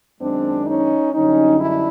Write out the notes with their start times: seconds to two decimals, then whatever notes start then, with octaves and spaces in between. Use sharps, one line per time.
0.19 F#2 D#3 G#3 C4 D4
0.66 C#4 D#4
1.14 F#2 D3 G3 C#4 D#4
1.60 D4 E4